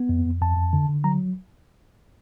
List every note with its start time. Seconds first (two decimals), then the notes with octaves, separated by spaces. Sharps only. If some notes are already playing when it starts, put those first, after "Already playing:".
Already playing: B3
0.09 F2
0.25 F2
0.42 F2 A5
0.57 F2
0.73 D3
0.89 D3
1.04 F#3 A#5